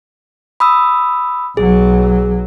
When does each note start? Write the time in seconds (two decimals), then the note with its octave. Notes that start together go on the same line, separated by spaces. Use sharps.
0.60 B5 D#6 E6
1.57 B1 F#3 G#4